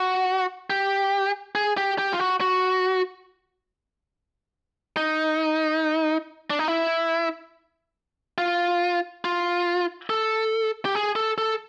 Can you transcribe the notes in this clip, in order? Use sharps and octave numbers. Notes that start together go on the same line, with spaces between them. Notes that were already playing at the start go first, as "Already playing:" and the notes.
Already playing: F#4
G4
G#4
G4
G4
F4
F#4
F#4
D#4
D4
D#4
E4
F4
F4
A4
G4
G#4
A4
A4